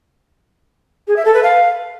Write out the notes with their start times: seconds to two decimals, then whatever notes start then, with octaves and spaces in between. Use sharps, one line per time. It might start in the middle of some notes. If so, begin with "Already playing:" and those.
1.08 G#4
1.16 E5
1.25 A4
1.34 B4
1.43 F5